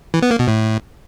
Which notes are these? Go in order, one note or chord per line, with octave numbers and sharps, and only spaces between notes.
E3
B3
A#3
B2
A2